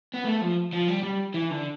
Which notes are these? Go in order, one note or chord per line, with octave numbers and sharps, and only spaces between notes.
B3
A3
F3
F3
G3
G3
E3
D3